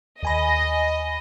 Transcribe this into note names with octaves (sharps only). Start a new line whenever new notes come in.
D#2 D#5 G#5 B5